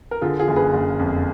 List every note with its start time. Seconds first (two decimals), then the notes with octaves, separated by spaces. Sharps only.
0.11 A#4
0.21 D3 F4 G#4
0.39 F4 G#4
0.48 F#1
0.56 G#4 B4
0.74 F#1
0.99 F2